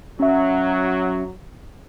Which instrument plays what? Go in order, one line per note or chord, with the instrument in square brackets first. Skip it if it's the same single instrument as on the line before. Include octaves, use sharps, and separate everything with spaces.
[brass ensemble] F#3 [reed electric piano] C#4 E5